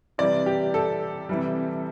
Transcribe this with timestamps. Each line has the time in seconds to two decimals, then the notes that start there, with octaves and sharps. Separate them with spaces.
0.18 C3 E3 G3 D5
0.46 G4
0.74 A4
1.29 C3 E3 G3